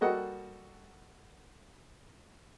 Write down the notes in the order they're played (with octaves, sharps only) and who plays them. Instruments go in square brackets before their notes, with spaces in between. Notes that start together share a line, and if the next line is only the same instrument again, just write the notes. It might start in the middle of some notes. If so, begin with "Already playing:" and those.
[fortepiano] G3 A#3 F#4 A4 D#5 F#5